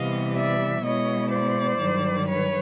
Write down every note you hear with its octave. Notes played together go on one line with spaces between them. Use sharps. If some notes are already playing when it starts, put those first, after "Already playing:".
Already playing: C3 E3 G3 B3 D#5 F5
D5 E5
B2 G#3 B3 E4 C#5 D#5
C5 D5
G2 D#3 F#3
B4 C#5